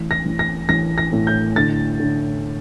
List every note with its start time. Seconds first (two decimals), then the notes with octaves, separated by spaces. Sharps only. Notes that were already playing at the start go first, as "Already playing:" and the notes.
Already playing: A1
0.11 A#6
0.26 A1
0.39 A#6
0.69 A1 A#6
0.98 A#6
1.13 A2
1.27 G6
1.56 D3 A6
2.00 D3